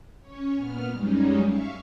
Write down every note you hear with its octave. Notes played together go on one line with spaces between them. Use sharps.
C#4 C#5
A#2 B3 F6
F#2 G3 G#3 C#4 D#4
E5 F5 C#6